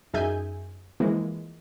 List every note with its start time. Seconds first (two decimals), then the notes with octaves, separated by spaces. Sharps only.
0.13 F#2 D#4 G#4 E5 G#5 G6
1.00 E3 F3 G#3 A#3